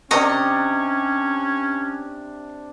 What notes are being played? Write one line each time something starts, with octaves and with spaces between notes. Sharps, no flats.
C3 C#4 D4 D#5 A#5 C#6